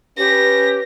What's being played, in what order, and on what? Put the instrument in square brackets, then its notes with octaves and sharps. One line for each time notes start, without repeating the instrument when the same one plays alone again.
[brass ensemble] C#4 B4 [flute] G4 [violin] A#6